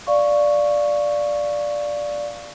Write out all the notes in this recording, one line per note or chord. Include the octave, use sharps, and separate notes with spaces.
D5 F5 C#6